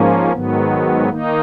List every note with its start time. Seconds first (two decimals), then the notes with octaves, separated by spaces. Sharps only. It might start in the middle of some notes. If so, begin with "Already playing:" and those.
Already playing: G#2 F3 A#3 C#4
0.32 G#2 D#3 F#3 B3
1.09 D#3 A#3 D#4